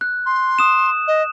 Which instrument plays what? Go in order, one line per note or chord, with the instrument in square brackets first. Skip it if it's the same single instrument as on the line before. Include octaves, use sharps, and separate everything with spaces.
[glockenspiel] F#6
[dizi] C6
[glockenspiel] D#6 E7
[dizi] D#5